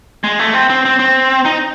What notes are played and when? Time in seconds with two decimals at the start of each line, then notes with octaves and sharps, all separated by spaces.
0.24 G#3
0.39 A3
0.54 C4
0.70 C4
0.85 C4
0.99 C4
1.45 D#4